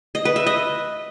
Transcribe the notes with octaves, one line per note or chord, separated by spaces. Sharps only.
D#5
B4
E5
D#5